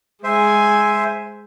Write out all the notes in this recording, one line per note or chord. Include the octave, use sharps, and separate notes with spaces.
G#3 C5 E5 G#5